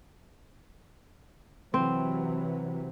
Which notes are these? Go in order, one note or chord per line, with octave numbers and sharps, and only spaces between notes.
C3 E3 F#3 C4